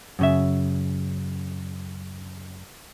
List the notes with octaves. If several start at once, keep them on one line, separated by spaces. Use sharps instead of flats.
F#2 C#3 E5